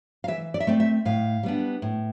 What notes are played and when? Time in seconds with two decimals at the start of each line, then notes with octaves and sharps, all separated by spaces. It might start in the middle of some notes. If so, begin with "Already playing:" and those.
0.24 F5
0.28 E3 E5
0.54 D5
0.60 E5
0.67 A3 C4 D5
0.80 E5
1.05 A2 F5
1.43 G3 B3 D4
1.82 A2